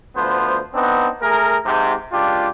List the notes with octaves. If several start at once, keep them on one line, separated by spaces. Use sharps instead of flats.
D2 F3 B3 C5
B3 C4 D4 D#4
A3 G#4 A#4
G#2 C3
C#2 D4 F4 G4